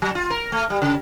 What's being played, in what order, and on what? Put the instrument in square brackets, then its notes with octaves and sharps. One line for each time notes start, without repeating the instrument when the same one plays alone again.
[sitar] F#3
F4
A#4
A3
G3
C#3